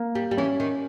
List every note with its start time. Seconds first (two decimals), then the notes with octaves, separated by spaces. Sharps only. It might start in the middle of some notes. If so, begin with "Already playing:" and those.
Already playing: A#3
0.15 G3
0.31 G3
0.38 E3 C#4
0.60 D#3